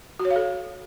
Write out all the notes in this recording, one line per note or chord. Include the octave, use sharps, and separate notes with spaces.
F#4
C#5
F5
A4